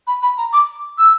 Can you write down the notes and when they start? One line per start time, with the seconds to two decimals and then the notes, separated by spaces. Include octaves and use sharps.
0.07 B5
0.23 B5
0.38 A#5
0.53 D6
0.99 E6